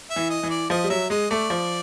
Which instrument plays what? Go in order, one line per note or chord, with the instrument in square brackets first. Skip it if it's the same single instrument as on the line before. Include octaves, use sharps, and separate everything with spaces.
[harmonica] E5
[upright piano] E3
[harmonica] D#5
[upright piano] E3
[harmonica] D5
[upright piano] F3 [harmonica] D#5
[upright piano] G3
[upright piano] F#3 [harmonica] E5
[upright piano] G#3 [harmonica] D#5
[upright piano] A3 [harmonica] D5
[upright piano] F3